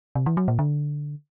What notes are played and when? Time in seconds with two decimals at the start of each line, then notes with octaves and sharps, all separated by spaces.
0.15 C3
0.26 E3
0.37 F#3
0.48 A#2
0.59 D3